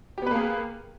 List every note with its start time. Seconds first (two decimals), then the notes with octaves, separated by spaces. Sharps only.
0.18 G4
0.22 B3
0.26 B4
0.31 A#3
0.35 G#4